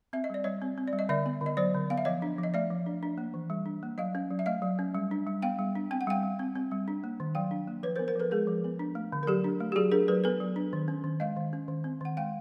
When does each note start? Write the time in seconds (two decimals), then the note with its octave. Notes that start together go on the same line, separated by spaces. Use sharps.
0.13 C4 E5
0.24 D#5
0.30 G3 D5
0.44 G3 C#5 D#5
0.62 C4
0.78 C4
0.88 D5
0.93 G3
0.99 D#5
1.09 D3 D5 E5
1.26 B3
1.41 D3
1.46 D#5
1.57 F#3 C5 D5
1.74 D3
1.90 B3 F5
1.98 E5
2.05 F3 C#5 D#5
2.22 D4
2.38 F3
2.43 D#5
2.54 A3 D5 E5
2.70 F3
2.86 D4
3.03 D4
3.18 A#3
3.34 E3
3.50 G3
3.66 D4
3.83 A#3
3.98 F#3 D#5 F5
4.15 C#4
4.30 F#3
4.39 E5
4.46 A3 D#5 F5
4.62 F#3
4.79 C#4
4.95 G3
5.11 D4
5.27 G3
5.42 B3 F5 G5
5.59 G3
5.75 D4
5.91 C4 G5
6.01 F#5
6.07 G3 F5 G5
6.23 G3
6.39 C4
6.55 C4
6.71 G3
6.88 D4
7.04 A#3
7.20 D#3
7.35 F#3 F5 G5
7.51 D4
7.67 A#3
7.83 F3 B4 C#5
7.96 A#4 C5
7.99 B3
8.08 A#4 C5
8.16 F3 A4 B4
8.31 G#3 G#4 A#4
8.47 F3
8.64 B3
8.79 D4
8.95 A3
9.12 D3
9.23 A#4
9.27 F#3 G4 A4
9.44 D4
9.60 A3
9.72 G4
9.76 F#3 F#4 G#4
9.92 D4 G#4 A#4
10.08 F#3 A4 B4
10.24 B3 A4 B4
10.40 F#3
10.56 D4
10.73 D#3
10.88 C#4
11.04 D#3
11.20 G#3 D#5 F5
11.37 D#3
11.53 C#4
11.68 D#3
11.84 C4
12.01 D#3 F#5
12.17 G#3 F5 G5